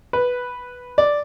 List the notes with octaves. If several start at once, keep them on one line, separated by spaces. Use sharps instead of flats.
B4
D5